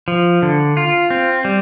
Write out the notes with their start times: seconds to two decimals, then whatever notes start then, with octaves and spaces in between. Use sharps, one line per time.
0.08 F3
0.42 D3
0.77 F4
1.10 C4
1.45 G3